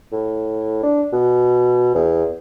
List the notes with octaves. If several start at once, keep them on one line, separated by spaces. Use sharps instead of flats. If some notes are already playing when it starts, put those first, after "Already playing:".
A2
D4
B2
E2